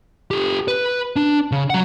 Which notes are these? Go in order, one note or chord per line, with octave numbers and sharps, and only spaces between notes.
G4 A4
B4
D4
C#3
F#3 F#5